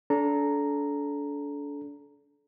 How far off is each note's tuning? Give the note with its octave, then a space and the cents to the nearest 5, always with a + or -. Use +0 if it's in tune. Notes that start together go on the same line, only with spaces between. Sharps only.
D4 -35 A4 -25 A#5 -5